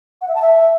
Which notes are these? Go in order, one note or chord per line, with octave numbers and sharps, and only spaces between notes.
F#5
E5
A5
E5